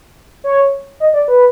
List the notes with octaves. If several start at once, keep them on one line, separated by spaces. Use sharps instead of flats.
C#5
D#5
D5
B4